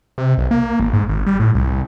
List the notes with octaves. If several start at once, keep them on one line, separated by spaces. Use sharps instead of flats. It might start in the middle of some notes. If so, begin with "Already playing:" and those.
C3
B1
A#3
G#1
G#2
G#1
G3
A2
C2